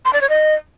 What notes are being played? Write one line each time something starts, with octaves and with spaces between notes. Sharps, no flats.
C6
D5
C#5
D#5